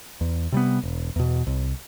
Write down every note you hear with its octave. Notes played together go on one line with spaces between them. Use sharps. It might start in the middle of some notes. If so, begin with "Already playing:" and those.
E2
C3 G3 B3
E1
E2 B2
C2